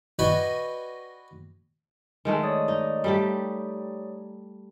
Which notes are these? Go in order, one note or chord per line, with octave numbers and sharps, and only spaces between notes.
F#4 B4 D5 D#5 G5 G#5
D#3 G#3 A3
C#5 D5 D#6
D#4
G3 A3 G4